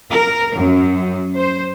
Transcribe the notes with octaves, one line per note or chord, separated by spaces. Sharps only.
A#4
F#2
C5